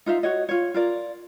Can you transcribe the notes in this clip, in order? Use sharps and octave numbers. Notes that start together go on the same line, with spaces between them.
D#4 F4 C5 E5
F#4 C#5 D#5
F4 C#5
F4 A#4 D5